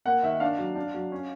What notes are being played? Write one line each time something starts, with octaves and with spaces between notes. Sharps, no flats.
A#3 F#5
D#3 E5
D4 F5
F#3
D4
F#3
C#4